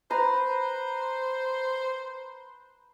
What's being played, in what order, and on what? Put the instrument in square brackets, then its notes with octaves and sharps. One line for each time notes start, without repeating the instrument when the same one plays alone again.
[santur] B4 A#5 [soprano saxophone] C5